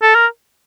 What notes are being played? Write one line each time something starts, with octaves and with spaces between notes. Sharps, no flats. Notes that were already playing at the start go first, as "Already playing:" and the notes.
A4
A#4